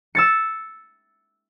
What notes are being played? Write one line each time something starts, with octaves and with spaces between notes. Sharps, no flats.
E6 A6 C#7